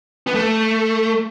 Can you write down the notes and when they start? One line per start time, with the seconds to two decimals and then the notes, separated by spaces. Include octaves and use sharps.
0.27 B3
0.35 A3